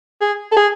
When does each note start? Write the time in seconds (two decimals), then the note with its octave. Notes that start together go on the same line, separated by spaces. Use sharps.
0.21 G#4
0.52 A4
0.57 G#4